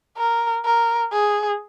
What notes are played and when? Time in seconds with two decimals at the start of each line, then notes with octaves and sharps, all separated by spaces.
0.17 A#4
0.65 A#4
1.13 G#4